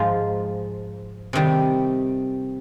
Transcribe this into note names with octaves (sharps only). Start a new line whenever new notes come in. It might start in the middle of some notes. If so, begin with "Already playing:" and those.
Already playing: G#2 F3 G#3 F4
C3 D#3 G3